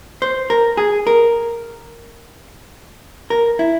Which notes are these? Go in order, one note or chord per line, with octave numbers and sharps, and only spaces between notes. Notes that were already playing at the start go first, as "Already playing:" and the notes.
C5
A#4
G#4
A#4
A#4
E4